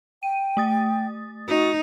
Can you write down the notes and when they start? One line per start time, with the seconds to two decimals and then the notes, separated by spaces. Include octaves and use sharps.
0.23 G5 D#7
0.57 A3 D#6 A6
1.48 D#4 F#4